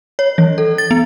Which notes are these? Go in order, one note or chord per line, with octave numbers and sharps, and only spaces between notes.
C#5
E3
A4
A6
B3